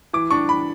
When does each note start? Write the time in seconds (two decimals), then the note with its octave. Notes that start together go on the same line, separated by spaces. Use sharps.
0.13 E3 D6
0.31 D4 C#6
0.49 E3 B5